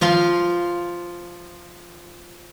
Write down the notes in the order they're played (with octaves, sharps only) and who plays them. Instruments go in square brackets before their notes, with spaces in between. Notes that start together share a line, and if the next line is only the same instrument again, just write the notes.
[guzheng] F3 F4 F5 C6